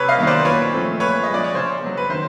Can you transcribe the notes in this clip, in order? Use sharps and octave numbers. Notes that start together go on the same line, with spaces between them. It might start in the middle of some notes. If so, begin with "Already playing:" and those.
Already playing: C3 B4 C#5
D#5 F5
D#3 F#3 B3
C5 D5
A#2 B4 C#5
F3 A3 C4
A#2 B4 C#5
G#3 D#5
F3 D5
C#5
C#3 C5
F#3 B3
B4
D#3 C5